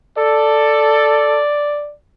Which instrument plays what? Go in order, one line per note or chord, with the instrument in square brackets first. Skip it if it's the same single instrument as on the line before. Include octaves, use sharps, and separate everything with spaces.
[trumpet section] A4 [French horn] D5